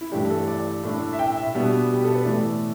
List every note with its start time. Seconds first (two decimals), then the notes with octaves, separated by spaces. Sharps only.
0.01 E4
0.12 G2 E3 A3 D4 G4
0.30 A4
0.48 D5
0.83 A2 A3 D4
1.13 E5
1.19 G5
1.37 E5
1.54 B2 G3 B3 D4
1.93 G4
2.04 A4
2.15 B4
2.25 A2 E3 A3 D5